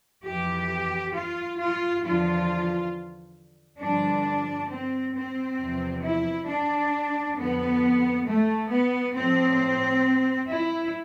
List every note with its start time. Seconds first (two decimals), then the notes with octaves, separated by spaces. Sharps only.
0.24 F2 E3 G4
1.14 F4
1.58 F4
2.02 E2 D3 F3 F4
3.80 G2 D3 F3 D4
4.69 C4
5.14 C4
5.59 E2 C3 F3
6.03 E4
6.47 D4
7.36 F2 D3 F3 B3
8.26 A3
8.70 B3
9.14 A2 F3 C4
10.48 E4